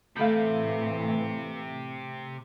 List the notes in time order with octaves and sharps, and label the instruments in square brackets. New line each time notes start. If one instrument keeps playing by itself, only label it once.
[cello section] A2 E3 [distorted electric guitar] C3 [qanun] A3 B5 [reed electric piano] F5 G6